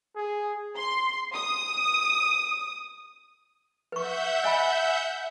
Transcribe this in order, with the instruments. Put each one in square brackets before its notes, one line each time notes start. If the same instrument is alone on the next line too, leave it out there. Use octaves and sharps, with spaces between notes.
[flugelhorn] G#4
[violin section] C6
D#6
[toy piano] B4 C#6 [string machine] E5 F#5 G6
[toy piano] D#5 G#5 B5